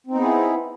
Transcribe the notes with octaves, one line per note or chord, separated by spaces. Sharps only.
B3 C4 D#4 E4 G#4